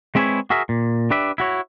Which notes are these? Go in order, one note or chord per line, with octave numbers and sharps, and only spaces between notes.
G#3 C4 E4 G#4 B4 C#5
F#4 G#4 A#4 E5
A#2
D4 G4 B4 D5 E5
E4 F#4 C#5